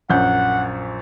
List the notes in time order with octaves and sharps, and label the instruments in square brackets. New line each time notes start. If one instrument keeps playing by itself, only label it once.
[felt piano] A#1 F#2 G6 [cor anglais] F#5